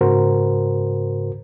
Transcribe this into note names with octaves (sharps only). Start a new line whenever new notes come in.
G#2 C#3 F#4 A#4 C5